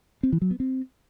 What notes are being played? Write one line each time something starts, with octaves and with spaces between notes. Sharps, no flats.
C4
E3
F#3
B3
C4